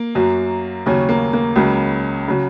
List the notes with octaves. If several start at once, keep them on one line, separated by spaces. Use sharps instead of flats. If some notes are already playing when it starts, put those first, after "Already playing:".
Already playing: A#3
F#2 F#3
D#2 C#3 F#3 C#4
A#3
A#3
C#2 C#3 F#3
C#3 F#3